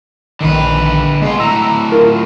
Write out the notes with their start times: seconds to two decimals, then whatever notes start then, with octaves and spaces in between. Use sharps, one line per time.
0.41 A#1 D3 D#3 B4
1.21 B2 G#3 F4
1.39 A2 F#3 A#5 E6
1.92 F4 A#4